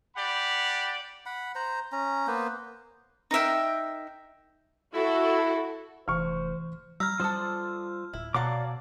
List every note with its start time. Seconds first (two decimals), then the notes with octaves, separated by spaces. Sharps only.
0.16 G4 D5 F#5 B5
1.26 F#5 B5
1.55 C5 A#5
1.92 C#4 A#5
2.27 A#3 B3 B4 C5
3.31 D#4 A#4 E5 G5
4.93 E4 F#4 A4
6.08 F1 E3 C5 C#6 F6
7.00 G3 A#5 B5 E6 F6
7.20 G3 D4 F4 A4 C5 D#6
8.13 D1 E4
8.34 B2 F#3 D5 F5 F#5 A5 D6